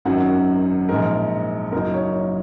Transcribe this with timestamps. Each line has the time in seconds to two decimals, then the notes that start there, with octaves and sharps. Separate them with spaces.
0.05 G#1 F#2 D#3 F#3 C#4 F#5
0.89 A#1 G#2 G#3 A#4
1.72 F#1 F#2 F#3 D#4 A#4
1.94 C#5